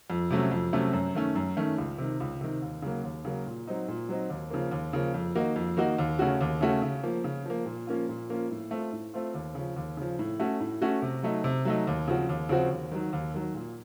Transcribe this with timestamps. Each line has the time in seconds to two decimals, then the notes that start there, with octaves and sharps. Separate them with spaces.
0.10 F2
0.31 C3 F#3 A3 C#4
0.51 F2
0.73 C3 F#3 A3 C#4
0.93 F#2
1.15 D#3 A3 C#4
1.35 F#2
1.57 D#3 A3 C#4
1.78 C#2
1.98 C3 D#3
2.20 C#2
2.41 C3 D#3
2.62 D#2
2.82 C#3 F#3 A#3
3.04 D#2
3.25 C#3 F#3 A#3
3.46 A#2
3.67 F#3 C4 D#4
3.88 A#2
4.09 F#3 C4 D#4
4.30 D#2
4.50 C#3 F3 A#3
4.71 D#2
4.93 C#3 F3 A#3
5.14 F2
5.36 D#3 A#3 D#4 F#4
5.56 F2
5.77 D#3 A#3 D#4 F#4
5.98 D#2
6.19 C#3 A3 C#4 F#4
6.41 D#2
6.61 C#3 A3 C#4 F#4
6.82 C#3
7.03 F3 A#3
7.24 C#3
7.46 F3 A#3
7.66 A#2
7.87 F3 A#3 C#4 F4
8.09 A#2
8.29 F3 A#3 C#4 F4
8.51 A2
8.71 A3 C4 F4
8.92 A2
9.14 A3 C4 F4
9.34 D#2
9.55 C#3 F3
9.76 D#2
9.97 C#3 F3
10.19 A2
10.40 A3 C#4 F#4
10.60 A2
10.82 A3 C#4 F#4
11.02 C3
11.23 F#3 A3 D#4
11.44 C3
11.65 F#3 A3 D#4
11.87 D#2
12.08 C#3 F3 C4 F#4
12.29 D#2
12.49 C#3 F3 C4 F#4
12.71 D#2
12.92 D#3 F#3
13.13 D#2
13.34 D#3 F#3
13.55 A#2